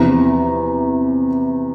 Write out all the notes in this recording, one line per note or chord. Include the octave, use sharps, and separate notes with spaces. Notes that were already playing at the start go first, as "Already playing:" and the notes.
Already playing: E2 C3 F3 A#5